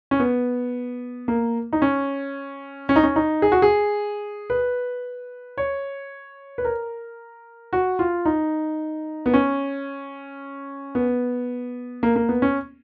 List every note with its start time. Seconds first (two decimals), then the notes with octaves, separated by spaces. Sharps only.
0.11 C#4
0.20 B3
1.28 A#3
1.73 D#4
1.82 C#4
2.89 C#4
2.96 D#4
3.03 C#4
3.16 D#4
3.42 G#4
3.52 F#4
3.62 G#4
4.50 B4
5.58 C#5
6.58 B4
6.65 A#4
7.73 F#4
7.99 F4
8.25 D#4
9.26 B3
9.34 C#4
10.95 B3
12.03 A#3
12.16 A#3
12.29 B3
12.42 C#4